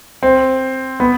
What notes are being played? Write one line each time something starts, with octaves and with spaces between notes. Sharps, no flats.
C4
B3